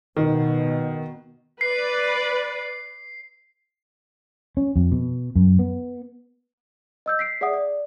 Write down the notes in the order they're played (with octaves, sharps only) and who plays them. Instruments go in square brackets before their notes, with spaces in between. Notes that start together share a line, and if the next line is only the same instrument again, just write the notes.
[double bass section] B2 [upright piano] D#3
[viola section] B4 D5 [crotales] C7
[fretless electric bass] C#4
F2
B2
F#2
B3
[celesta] D#5 E6 G6
B6 C7 D7
G#4 D5 E5 F#5 D#6
D5